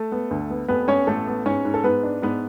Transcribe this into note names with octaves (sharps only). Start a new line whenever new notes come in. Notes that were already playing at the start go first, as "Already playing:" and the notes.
Already playing: A3 A4
B3
D2
B3
F1 B3 B4
B3 C#4 C#5
A1 A3 A4
B3
G#2 C#4 C#5
G#2
A4
G#2 B3 B4
D4
G#2 B3 B4